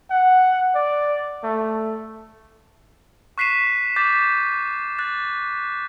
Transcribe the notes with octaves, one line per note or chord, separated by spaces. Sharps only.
F#5
D5
A3
C#6 F#6 B6 C7 D#7 E7
D6 G6 A6 B6
F#6 A6